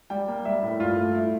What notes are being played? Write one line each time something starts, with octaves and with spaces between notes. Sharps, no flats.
G3 G5
A#3
G3 E5
A2
G2 F4
A3
E4